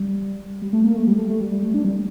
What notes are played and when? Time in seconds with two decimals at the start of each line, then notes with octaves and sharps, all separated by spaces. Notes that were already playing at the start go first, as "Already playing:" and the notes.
Already playing: G3
0.62 G3
0.73 A3
0.84 A#3
0.96 A3
1.07 G3
1.18 A3
1.29 A3
1.40 G3
1.51 G3
1.62 A3
1.74 D4
1.85 G3